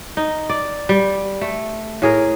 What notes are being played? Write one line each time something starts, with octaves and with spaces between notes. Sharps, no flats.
D#4
D5
G3
A3
A2 G#4 A#4